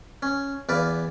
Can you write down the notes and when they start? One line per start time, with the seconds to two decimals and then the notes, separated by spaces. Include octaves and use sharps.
0.22 C#4
0.69 E2 B4 D5 F5